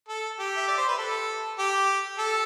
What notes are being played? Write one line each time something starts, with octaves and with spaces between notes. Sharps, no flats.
A4
G4
E5
D5
C5
B4
A4
G4
A4